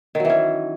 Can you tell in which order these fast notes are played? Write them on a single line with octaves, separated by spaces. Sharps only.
D#3 F#3 E3 C#4